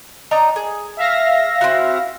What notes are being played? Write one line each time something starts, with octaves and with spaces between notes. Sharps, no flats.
D4 D#4 A#5
G#4
E5 F5 A#6
C4 E4 F#4